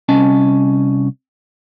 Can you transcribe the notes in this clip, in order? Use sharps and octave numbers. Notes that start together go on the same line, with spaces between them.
C2 C#4 D#5 G#5 A5